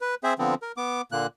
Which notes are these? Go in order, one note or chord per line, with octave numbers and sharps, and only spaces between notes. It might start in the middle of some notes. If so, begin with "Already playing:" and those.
B4
C4 G#4 C5 E5
D3 F3 B3 C4
A#4
B3 D6
A#2 D3 A#3 F#6